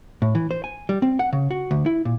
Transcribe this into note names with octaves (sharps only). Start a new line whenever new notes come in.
A2
E3
C5
G#5
G3
C4
F#5
C#3
F#4
D2
E4
A#2